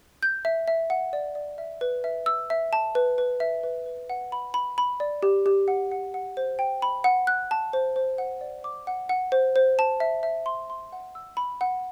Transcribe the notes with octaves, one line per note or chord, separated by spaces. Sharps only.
G6
E5
E5
F#5
D5
D5
E5
B4
E5
E6
E5
A5
B4
B4
E5
B4
B4
F#5
B5
B5
B5
D5
G4
G4
F#5
F#5
F#5
C5
G5
B5
F#5
F#6
A5
C5
C5
F#5
D5
D6
F#5
F#5
C5
C5
A5
E5
E5
C6
C6
F#5
E6
B5
F#5